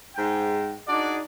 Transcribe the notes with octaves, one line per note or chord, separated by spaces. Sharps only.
G#2 G5
D4 D#4 F#4 G#4 D5